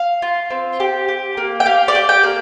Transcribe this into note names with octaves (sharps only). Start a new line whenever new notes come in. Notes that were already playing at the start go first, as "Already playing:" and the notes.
Already playing: F5
F4
C4
G4
G4
A#3
G5
G4 F5
D5
G4
G5
A#3